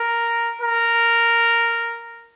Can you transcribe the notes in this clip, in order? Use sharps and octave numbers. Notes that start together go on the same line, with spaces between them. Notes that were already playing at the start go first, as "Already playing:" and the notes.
Already playing: A#4
A#4